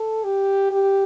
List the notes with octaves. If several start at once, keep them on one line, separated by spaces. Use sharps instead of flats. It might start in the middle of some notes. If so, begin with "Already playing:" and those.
Already playing: A4
G4
G4